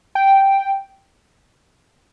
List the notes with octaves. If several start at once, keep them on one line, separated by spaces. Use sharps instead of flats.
G5